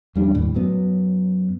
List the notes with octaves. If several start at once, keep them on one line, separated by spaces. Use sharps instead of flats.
F2 G3 D4
D#2 A2
F#2 F#3 B3